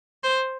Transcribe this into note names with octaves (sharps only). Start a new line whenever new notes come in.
C5